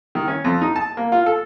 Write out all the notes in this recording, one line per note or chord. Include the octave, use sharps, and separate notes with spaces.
D#3
C#4
F2
D#4
A5
A#3
F4
A4